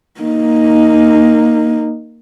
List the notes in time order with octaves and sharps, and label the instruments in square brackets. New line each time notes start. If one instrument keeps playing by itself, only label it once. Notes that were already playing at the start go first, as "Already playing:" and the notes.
[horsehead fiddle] A#3 D#4